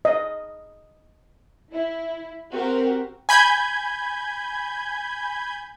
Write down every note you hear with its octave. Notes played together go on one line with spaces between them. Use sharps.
D#5
E4
C4 F#4 G4 A#4
G#5 B5 G6 G#6